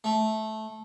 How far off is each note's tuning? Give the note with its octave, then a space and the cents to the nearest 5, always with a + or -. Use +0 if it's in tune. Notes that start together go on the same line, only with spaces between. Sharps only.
A3 -15